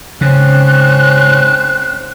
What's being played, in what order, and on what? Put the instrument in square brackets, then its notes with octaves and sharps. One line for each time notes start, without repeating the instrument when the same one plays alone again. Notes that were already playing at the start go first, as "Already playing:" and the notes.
[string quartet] G#2 C4 C#4 [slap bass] C#3 [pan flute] F#6